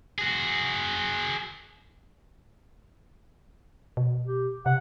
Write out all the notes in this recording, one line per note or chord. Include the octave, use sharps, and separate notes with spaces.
F#4 G#4
B2
G4
C3 F#5